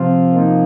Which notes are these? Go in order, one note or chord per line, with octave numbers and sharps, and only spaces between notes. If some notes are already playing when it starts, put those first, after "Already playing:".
Already playing: C3 F3 C4 F4
A#3 D#4